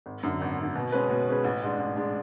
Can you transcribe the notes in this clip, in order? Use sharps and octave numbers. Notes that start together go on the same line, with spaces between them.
G#1
F#2 D3
G#1
F#2 D3
B2
G#3 C#4 G#4 B4
B2
G#3 C#4 G#4 B4
A1
G#2 G#3 D4
A1
G#3 D4